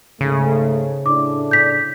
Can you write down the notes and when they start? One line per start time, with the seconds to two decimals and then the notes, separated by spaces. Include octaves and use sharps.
0.21 G#2 C#3 A3
1.06 A2 D4 D6
1.51 G6 B6